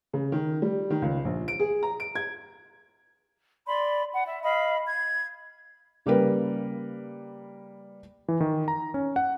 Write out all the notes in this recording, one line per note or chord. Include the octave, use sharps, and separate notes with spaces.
C#3
D#3
G3
D#3
C#2
A#1
D7
G#4
A#5
D7
G#6
D5 B5 C6
F#5
E5
D#5 F5 B5
G#6
C#3 G3 A#3 A#4 B4
E3
D#3
A#5
C#4
F#5